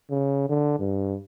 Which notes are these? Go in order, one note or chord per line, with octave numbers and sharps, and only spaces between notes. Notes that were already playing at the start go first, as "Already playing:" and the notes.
C#3
D3
G2